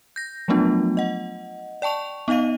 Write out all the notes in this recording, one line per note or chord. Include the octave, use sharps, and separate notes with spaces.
G6 A#6
F3 F#3 A3 B3 D4 F4
D#5 F#5
D5 G5 A5 C#6 F7
B3 D#4 D#5 F5 D#7